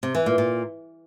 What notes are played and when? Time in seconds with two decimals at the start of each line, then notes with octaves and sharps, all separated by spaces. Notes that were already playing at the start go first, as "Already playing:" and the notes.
0.03 C3
0.15 E3
0.26 A#2
0.38 A#2